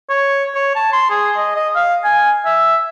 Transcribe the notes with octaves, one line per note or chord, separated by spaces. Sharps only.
C#5
C#5
A5
C6
G#4
D#5
D#5
F5
G#5
E5